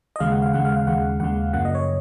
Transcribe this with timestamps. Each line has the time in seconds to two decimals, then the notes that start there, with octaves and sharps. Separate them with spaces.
0.16 D#5
0.20 D#2 C#3 G#3 F5
0.32 F#5
0.42 F5
0.53 D#2 C#3 G#3 F#5
0.65 F5
0.76 F5
0.87 D#2 C#3 G#3 F#5
1.20 D#2 C#3 G#3 F#5
1.53 F#2 C#3 F3 A#3 F#5
1.65 D#5
1.75 C#5